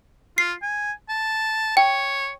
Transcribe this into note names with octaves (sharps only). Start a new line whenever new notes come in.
F4 C7
G#5
A5
C#5 G5